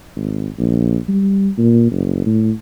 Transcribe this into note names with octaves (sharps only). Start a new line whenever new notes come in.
G#1
A#1
G3
A#2
F#1
A2